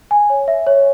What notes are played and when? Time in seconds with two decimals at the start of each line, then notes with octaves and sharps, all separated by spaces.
0.11 G#5
0.30 C#5
0.48 E5
0.67 C#5